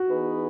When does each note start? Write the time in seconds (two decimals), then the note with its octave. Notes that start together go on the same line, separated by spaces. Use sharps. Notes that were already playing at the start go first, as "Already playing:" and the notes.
Already playing: F#4
0.09 E3 B3 D#4 G#4 B4